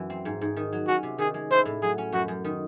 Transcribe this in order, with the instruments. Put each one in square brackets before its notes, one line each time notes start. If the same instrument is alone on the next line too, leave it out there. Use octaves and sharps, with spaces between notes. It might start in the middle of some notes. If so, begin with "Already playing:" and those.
Already playing: [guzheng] F#2 E3
C4
G#2
G#2
D#3
F#3
[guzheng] C#4 [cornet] F#4
[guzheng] C3
[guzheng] D#3 [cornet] G#4
[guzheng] G#3
[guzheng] E4 [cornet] C5
[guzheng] A2
[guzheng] F#3 [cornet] G#4
[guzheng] C#4
[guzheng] F#2 [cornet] F#4
[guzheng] F#2
D#3